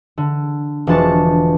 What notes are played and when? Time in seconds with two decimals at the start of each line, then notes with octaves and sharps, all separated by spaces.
0.18 D3
0.87 E1 F3 D4 A5 C#6